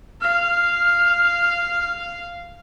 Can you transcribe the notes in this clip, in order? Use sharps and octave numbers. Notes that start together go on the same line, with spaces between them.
F5 F6